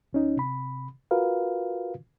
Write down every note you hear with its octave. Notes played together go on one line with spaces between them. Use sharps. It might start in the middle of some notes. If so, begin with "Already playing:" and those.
D2 C#4 D#4
C3 B5
F4 F#4 A#4 B4 F5